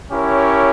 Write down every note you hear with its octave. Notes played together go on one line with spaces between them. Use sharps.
C#4 E4 G4 A#4 C#5